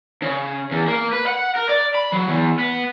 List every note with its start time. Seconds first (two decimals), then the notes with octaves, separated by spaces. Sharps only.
0.22 C#3
0.72 E2
0.88 A#3
1.13 B4
1.26 F#5
1.56 A#4
1.69 D5
1.95 B5
2.13 F#3
2.29 E2
2.59 B3